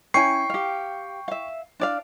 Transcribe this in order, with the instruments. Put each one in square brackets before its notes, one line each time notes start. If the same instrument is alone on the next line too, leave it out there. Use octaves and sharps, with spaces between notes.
[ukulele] C#4 E4 G#5 [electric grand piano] G5 C#6 C7
[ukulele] G4 F5
E5 F5
D4 D5 F5